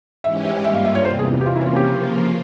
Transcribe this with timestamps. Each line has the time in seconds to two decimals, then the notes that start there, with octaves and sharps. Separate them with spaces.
0.24 G#2 E3 G#3 C#4 G4 E5
0.44 E5
0.64 G2 G3 A#3 F4 E5
0.74 F5
0.85 E5
0.95 C#5
1.05 E2 C3 E3 C5
1.19 G#4
1.41 G4
1.46 C3 E3 A#3 C#4 F4
1.56 E4
1.66 F4
1.76 G4
1.86 C#3 F3 A#3 F4